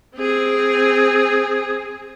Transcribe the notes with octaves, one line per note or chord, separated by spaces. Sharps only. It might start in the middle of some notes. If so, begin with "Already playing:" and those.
C4 G#4